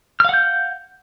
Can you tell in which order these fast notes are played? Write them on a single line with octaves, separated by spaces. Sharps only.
F6 F5 F#5 G6